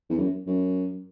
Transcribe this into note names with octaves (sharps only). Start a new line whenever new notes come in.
E2
F#2
F#2